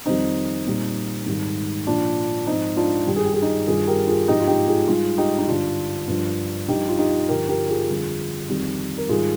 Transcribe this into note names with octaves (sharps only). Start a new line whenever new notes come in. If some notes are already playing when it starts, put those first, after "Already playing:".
F2 D#3 G3 C4 D#4
A#2 G3
G#2 D#3 G3
A#2 F3 D4 F4
G#2 F3 C4 D#4
D4 F4
G2 D#3 G3 G4
G#4
G4
G#4
D#4 G4
G2 D#3 G3 F4 G#4
G4 A#4
F4 G#4
G#2 F3 D#4 G4
F4
D#4 G4
F4 G#4
G#2 G3 F4 G#4
D#4 G4
D#4
G2 D3 G3 D4 F4
G2 F3
G2 F3 D#4 G4
F4
D#4 G4
G2 D3 F3 G4 A#4
G4 A#4
F4 G#4
F2 D3 G3
F2 D#3 G3
A#4
G#2 D#3 G3 F4 G#4